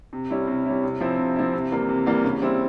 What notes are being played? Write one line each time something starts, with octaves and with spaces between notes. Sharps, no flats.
C3
G3 C#4 E4
C3
G3 C#4 E4
C3
F3 C4 E4
C3
F3 C4 E4
C3
E3 G3 A#3
C3
E3 G3 A#3
C#3
G3 C4 E4